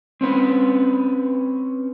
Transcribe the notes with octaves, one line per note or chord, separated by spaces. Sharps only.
C4 C#4 B4